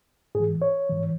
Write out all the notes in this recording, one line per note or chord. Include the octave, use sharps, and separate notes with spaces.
G#2 E3 G#4
C#5
G#2 E3